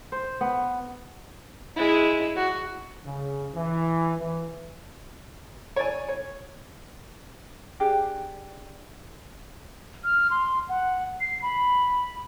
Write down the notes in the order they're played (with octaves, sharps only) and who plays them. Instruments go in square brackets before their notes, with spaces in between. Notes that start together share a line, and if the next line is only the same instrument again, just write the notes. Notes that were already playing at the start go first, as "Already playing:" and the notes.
[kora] C5
B3
[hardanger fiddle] G#3 E4
F#4
[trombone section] C#3
E3
E3
[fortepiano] C#5 D5 G#5
C#5
[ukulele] D4 G4 G#4
[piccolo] F6
C6
F#5
C7
B5